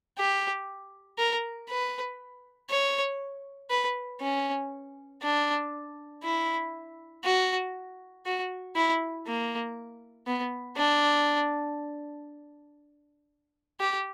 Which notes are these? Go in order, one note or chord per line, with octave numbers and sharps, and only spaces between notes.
G4
A#4
B4
C#5
B4
C#4
D4
E4
F#4
F#4
E4
A#3
B3
D4
G4